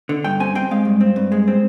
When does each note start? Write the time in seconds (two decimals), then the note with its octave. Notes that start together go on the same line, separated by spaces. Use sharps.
0.09 D3
0.24 G2 G5
0.40 C4 G#5
0.55 C4 G5
0.71 G#3 F5
0.85 G2
1.01 C4
1.16 G2
1.32 G#3
1.48 C4